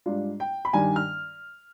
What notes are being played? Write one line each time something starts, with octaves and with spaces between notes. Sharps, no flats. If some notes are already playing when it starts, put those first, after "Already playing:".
G#2 G3 D4 F4
G5
B5
G2 D#3 G3 D4 G#5
F6